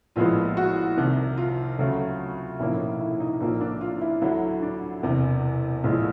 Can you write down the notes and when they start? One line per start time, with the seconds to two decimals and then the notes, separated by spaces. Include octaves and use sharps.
0.16 A#1 A2 F3 G#3 B3 F4
0.57 F#4
0.97 C2 C3 D#3
1.37 F4
1.79 D2 C#3 F#3 A3
2.59 B1 A2 F3 A#3 C#4 E4
2.80 D#4
3.00 E4
3.20 D#4
3.40 A#1 A2 F3 A#3 D#4
3.61 D4
3.81 F4
4.01 E4
4.22 D2 D3 F#3 E4
4.62 D4
5.03 E1 E2 C3
5.84 A#1 A2 F3 G#3